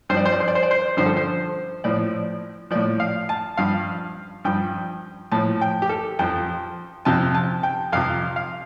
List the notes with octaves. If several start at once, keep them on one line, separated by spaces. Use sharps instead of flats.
G2 F3 C5 D5
C5
D5
C5
D5
C5
D5
C5
G2 D3 F3 C5
A4
C5
A2 F3 D5
A2 F3 D5
F5
A5
G2 F3 F5
G2 F3 G5
A2 F3 A5
G5
G4
A4
F2 F3 G5
F2 C3 F3 A5
A5
G5
F2 C3 F3 F5
F5